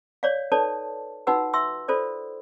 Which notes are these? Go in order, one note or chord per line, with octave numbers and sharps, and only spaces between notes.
C#5 D5 F5
D#4 A4 B4 C#5 D5 A5
D#4 F4 F#4 B4 F#5 E6
E5 C6 E6
F4 A4 C5 D5